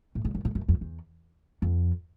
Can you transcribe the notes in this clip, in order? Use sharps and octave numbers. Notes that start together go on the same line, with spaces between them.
A2
G#2
F#2
A2
F#2
F2
E2
F2